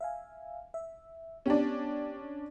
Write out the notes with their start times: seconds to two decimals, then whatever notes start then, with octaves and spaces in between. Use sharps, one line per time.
0.01 E5 F5 G#5
0.74 E5
1.46 B3 C#4 D4 G4 G5